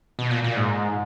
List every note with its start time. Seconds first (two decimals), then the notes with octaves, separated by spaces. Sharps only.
0.19 B2
0.31 A#2
0.44 A#2
0.56 G#2